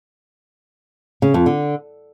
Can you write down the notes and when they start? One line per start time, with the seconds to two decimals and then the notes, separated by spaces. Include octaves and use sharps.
1.22 C#3
1.34 F2
1.46 D3